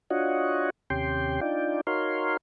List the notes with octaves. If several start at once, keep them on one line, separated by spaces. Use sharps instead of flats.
D4 F4 F#4 C#5 D#5 F#5
D#2 C3 C#4 G4 G5 C6
D4 D#4 F4 D5 G5
D#4 F#4 A#4 C#5 F5 C6